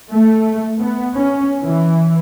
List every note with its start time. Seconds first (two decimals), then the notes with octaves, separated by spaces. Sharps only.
0.11 A3
0.79 B3
1.16 C#4
1.63 E3